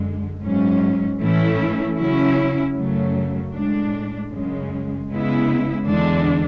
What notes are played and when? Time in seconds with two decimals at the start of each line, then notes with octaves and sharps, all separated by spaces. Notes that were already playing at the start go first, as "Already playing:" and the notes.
Already playing: F#2 D3 G#3
0.42 G#2 F#3 C#4
1.20 A2 E3 A3 C#4 E4
1.97 C#3 F#3 C#4 E4
2.75 F#2 C#3 F#3 A3
3.52 A2 G#3 D4
4.30 F#2 C#3 G#3
5.09 C#3 G#3 B3 E4
5.86 E2 D3 G#3 D4